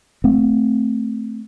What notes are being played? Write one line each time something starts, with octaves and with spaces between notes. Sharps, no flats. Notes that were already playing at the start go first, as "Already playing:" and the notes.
A3 C4